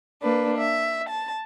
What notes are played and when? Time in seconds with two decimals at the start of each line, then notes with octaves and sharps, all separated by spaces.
0.23 A#3 D4 B4
0.58 E5
1.09 A5